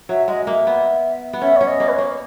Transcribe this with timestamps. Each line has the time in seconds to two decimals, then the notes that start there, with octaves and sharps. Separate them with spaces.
0.09 F#3 E5
0.28 G#3 D#5
0.47 A#3 E5
0.67 B3
1.33 B3
1.42 C#4 E5
1.57 C#4 C#5
1.68 D#5
1.80 A#3
1.88 B4
1.93 C#5
1.99 A#3